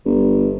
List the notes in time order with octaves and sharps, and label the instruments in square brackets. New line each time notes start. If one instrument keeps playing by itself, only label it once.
[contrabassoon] G1